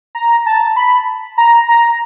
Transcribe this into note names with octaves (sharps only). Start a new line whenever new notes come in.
A#5
A5
B5
A#5
A#5